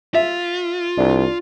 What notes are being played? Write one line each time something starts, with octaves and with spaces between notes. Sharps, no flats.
F4 E5
C2 D4